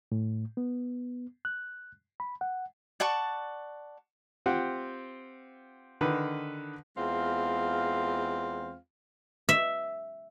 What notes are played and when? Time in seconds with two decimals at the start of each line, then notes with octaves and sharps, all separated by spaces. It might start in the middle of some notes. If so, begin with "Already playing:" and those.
0.12 A2
0.57 B3
1.45 F#6
2.20 B5
2.41 F#5
3.00 D5 F#5 A5 C#6
4.46 C4 F4 G4 F#5
6.01 D3 D#3 D#4 B4
6.97 E2 G#3 C4 F4 F5
9.49 E5